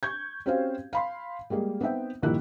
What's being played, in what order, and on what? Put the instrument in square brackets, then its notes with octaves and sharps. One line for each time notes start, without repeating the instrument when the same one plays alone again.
[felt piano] C#6 G6 G#6
C4 C#4 F#4 G4 C5 F5
F5 B5 C6
G3 G#3 A#3 G#4
B3 C4 D#4 E5 G5
A#1 G2 D#3 A#3 E4 F#6